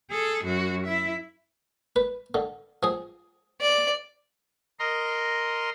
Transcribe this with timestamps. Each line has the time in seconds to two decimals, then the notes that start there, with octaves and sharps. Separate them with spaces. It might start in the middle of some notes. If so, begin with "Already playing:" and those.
0.10 G#4 A4
0.44 F#2 F#4
0.86 E4 E5
1.96 B4
2.34 D3
2.83 F3 G#4
3.61 D5
4.79 A#4 D#5 A#5 C6